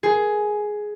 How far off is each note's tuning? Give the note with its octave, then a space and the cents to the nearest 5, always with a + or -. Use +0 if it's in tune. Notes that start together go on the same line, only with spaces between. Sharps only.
G#4 +10